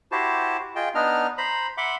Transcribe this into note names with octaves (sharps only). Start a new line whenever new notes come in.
E4 F#4 G4 C5 A5
F4 G#4 D#5 G5
B3 D4 D#4 D#5 F6
C5 A#5 B5
E5 F#5 B5 C6 D6